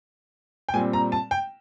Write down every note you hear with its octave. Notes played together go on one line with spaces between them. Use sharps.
G5
A#2 G3 C4 G#5
A#5
A5
G5